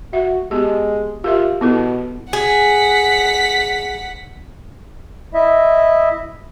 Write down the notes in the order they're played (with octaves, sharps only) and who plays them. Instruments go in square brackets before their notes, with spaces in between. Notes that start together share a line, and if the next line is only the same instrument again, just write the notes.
[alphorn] F#4 [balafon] E5
[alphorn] G#3 [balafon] B3 G4
[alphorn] F4 [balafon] G4 A#4 E5
[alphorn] B2 [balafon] B3 E4 A4
[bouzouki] G#4 [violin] F#5 B6
[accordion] E4 D#5 E5